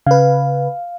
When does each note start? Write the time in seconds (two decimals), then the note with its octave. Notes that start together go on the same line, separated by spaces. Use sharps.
0.07 C#3 B4 F5